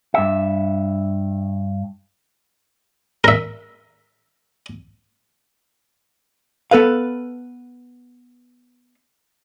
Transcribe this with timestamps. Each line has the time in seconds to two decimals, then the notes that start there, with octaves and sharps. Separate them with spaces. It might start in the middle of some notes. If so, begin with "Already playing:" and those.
0.14 G2 E5
3.24 A#4 E5
6.71 B3 A4 B4 F5